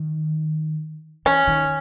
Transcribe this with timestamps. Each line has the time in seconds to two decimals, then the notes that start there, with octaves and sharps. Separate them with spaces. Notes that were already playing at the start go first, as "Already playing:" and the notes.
Already playing: D#3
1.25 E3 C#4
1.47 D#3